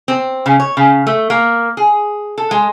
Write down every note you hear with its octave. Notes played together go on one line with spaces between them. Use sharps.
C4
C#3
C#5
C#3
A3
A#3
G#4
A4
G#3